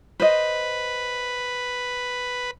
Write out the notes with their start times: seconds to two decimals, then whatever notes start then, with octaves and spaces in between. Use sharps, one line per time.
0.20 B4 C5 D#5